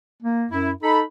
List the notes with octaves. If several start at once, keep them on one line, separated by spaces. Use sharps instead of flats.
A#3
F#2 E4
D#4 A4 B5